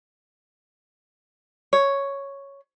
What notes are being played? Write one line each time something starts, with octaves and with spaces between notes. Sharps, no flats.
C#5